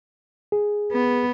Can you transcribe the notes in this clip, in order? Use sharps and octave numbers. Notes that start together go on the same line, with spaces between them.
G#4
B3